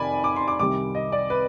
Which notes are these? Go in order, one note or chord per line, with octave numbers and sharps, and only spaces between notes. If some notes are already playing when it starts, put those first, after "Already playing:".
Already playing: F2 C3 D#3 D5 G#5 B5
D6
C6
D6
C2 C3 D#3 G3 D6
D#5
D5
B4